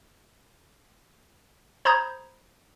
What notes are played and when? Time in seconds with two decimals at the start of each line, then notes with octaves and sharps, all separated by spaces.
1.85 C5 A#5 B5 D#6 G6 G#6